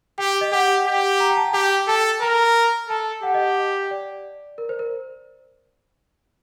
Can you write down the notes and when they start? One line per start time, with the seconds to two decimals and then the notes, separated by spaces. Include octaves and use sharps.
0.18 G4 G5
0.41 D#5
0.52 G4 F#5
0.86 G4
1.20 A#5
1.30 G5
1.37 A5
1.54 G4 G5
1.88 A4 A5
2.21 A#4 A#5
2.89 A4 A5
3.23 G4 F#5
3.34 D#5
3.91 D5
4.58 A#4
4.69 C5
4.79 A#4